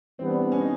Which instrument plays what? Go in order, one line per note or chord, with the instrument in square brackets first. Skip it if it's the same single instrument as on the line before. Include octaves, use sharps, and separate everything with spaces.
[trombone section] E3 G3 B3 D4 [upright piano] C4
[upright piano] C#4
D#4